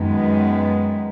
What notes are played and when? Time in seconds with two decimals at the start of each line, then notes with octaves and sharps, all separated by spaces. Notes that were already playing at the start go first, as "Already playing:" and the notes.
Already playing: F#2 D#3 G#3 B3